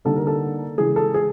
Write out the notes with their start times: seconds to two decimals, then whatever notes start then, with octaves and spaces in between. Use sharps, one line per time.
0.05 D3 G3 A#3 D#4 A4
0.16 A#4
0.27 A4
0.78 C#3 E3 G#3 G#4
0.96 A4
1.14 G#4